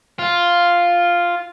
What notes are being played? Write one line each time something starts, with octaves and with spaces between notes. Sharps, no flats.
F4